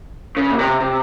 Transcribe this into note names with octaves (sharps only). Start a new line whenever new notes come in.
C#3
A#2
C3
C3